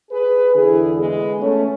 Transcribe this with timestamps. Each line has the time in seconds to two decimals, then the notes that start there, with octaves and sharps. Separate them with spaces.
0.11 G#4 B4
0.54 E2 D3 E4 G#4
0.97 G#3 B3
1.39 A3 C#4